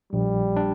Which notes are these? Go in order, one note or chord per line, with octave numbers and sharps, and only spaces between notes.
A#1 G3
D4